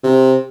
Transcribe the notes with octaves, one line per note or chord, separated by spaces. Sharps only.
C3